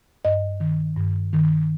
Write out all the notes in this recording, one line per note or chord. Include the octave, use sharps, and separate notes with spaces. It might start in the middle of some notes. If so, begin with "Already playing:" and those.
G2 D#5
D#3
G2
D#3